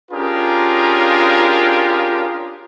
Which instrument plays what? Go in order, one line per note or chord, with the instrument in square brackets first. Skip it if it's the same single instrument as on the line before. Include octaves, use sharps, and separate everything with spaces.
[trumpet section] C#4 D4 F4 G4 G#4 A#4